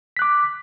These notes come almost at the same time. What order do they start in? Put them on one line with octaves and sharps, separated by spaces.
B6 F#6 D6